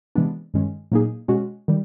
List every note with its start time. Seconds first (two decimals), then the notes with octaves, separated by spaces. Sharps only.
0.15 C3 E3 G#3 B3 D4
0.54 G2 D#3 G#3 C#4
0.92 A#2 F#3 A#3 D#4 G#4
1.28 B2 G#3 C#4 F#4
1.68 D#3 G3